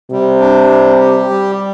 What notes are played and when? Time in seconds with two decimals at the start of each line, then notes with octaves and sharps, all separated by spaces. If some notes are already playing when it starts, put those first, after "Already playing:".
0.11 C3 G3
0.40 D4
0.70 G3
1.00 G4
1.30 G3